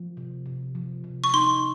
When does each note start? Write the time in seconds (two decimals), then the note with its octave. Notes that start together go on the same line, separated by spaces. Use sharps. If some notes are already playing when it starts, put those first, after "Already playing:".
Already playing: F3
0.17 C3
0.46 C3
0.75 F3
1.04 C3
1.24 C#6
1.34 D#4 C6